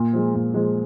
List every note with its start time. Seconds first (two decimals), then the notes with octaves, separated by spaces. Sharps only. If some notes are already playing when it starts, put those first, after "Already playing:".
Already playing: A#2
0.13 F3 G#3
0.34 A#2
0.54 F3 G#3